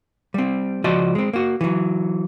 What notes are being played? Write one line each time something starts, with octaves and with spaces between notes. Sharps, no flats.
G3 C4
C#2 F3 F#4 D5 D#5
G#3 C4
A#3 F#4
E3 F#3